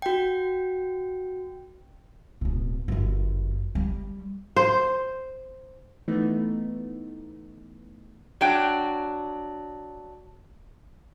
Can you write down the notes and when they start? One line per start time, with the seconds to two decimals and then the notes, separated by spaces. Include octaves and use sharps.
0.02 F#4 G5
2.41 D1 B2
2.88 G1 F#2
3.75 G3
4.56 C5
6.08 E3 A3 B3 D#4
8.41 F#3 D4 G5